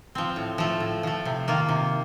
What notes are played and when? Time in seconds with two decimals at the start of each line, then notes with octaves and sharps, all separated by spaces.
0.15 F3 C4
0.36 A2
0.58 F3 A3
0.80 A2
1.03 F3 A3
1.25 C3
1.48 D#3 A#3 F4
1.69 C3